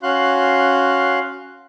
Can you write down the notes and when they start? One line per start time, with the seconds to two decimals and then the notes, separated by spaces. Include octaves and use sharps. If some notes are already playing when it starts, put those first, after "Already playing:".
0.03 C#4 F#4 F5 C6 F#6